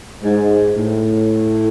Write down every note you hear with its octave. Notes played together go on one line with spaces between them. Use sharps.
G#2
A2